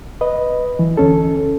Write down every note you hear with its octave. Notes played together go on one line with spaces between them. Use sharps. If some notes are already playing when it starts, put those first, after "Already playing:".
B4 D#5
E3
D2 C#4 A4